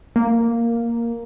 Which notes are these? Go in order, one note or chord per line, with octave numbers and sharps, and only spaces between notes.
A#3